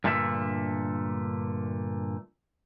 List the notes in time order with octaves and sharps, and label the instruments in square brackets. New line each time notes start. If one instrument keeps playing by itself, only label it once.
[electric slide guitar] G2 A#2 D3 A3 E5